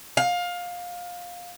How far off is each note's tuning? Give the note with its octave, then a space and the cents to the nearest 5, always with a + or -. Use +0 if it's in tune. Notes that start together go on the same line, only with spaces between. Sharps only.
F5 +20